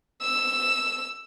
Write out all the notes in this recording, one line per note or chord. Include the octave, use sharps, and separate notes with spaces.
E6